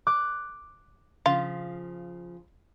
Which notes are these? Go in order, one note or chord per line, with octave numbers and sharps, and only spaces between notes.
D6 F#6
C#3 F3 F4